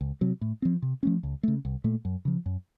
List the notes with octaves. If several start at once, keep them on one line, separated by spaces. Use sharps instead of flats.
C#2
C3 F#3
A2
F3 C4
C3
F3 A3 C#4
C#2
C#3 A3
C2
A#2 A3
F#2
C#3 F3
F#2